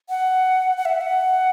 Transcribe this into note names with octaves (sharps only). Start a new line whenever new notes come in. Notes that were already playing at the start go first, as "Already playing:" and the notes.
F#5
F#5
E5
F#5